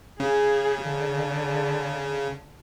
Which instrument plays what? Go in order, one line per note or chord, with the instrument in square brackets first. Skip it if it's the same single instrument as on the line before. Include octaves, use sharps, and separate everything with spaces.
[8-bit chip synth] C#3 [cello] G#4
[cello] D3